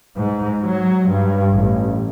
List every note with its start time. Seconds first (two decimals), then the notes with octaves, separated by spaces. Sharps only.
0.17 G#2
0.62 F#3
1.07 G2
1.52 A1